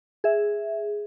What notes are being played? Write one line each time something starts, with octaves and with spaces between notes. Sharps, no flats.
G#4 E5